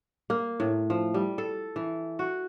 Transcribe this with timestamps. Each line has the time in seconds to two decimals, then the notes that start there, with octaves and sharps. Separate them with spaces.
0.30 A#3
0.60 A2
0.90 F3
1.14 G3
1.38 A4
1.76 E3
2.19 F#4